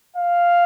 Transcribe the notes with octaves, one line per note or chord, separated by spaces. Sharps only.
F5